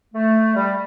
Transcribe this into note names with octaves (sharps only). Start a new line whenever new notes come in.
A3
G3